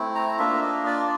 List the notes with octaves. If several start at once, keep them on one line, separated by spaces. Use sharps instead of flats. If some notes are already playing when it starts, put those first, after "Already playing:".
Already playing: A3 C4 E4
A#5
A#3 D4 F4 E5
D#5
D5